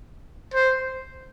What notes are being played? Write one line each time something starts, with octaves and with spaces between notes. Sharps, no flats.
C5